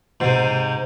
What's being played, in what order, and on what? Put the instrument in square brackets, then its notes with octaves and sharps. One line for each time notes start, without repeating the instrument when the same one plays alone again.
[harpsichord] G#2 C3